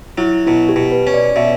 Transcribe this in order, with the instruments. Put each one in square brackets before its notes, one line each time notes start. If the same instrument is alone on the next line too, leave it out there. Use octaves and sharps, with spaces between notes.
[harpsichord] F#3 [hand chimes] E4
[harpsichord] B2 [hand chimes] E4
[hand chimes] G4
[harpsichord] B2
[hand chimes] B4
[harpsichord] C#4
[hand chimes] D5
[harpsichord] B2 [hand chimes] E5